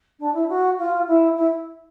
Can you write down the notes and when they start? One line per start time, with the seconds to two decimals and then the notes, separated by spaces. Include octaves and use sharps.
0.19 D4
0.33 E4
0.49 F#4
0.78 F4
1.07 E4
1.36 E4